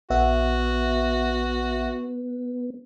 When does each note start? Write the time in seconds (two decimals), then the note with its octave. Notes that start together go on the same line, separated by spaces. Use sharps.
0.10 A#1 B3 F#4 E5 F#5